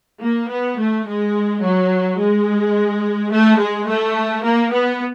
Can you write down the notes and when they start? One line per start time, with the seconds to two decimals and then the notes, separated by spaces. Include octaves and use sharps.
0.23 A#3
0.49 B3
0.78 A3
1.07 G#3
1.63 F#3
2.18 G#3
3.32 A3
3.59 G#3
3.87 A3
4.43 A#3
4.72 B3